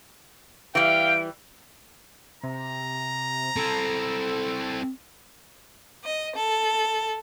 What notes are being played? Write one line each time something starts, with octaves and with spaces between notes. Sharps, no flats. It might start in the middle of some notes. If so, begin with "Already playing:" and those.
E3 G3 F5 G5 D7
C3 A#5
C4 E4 A4
D#5
A4